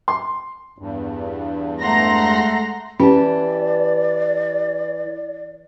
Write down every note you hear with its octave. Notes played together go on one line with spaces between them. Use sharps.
C6
E2 G2
G#3 A3 F#5 A#5 C6 A#6
E3 C#4 G4 D5 A5